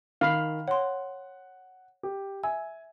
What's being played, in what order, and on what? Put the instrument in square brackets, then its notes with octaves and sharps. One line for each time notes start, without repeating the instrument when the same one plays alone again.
[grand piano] D#3 [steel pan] F5 B5
[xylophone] C#5 C6 [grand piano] F#5
[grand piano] G4
[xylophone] E5 E6 [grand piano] G#5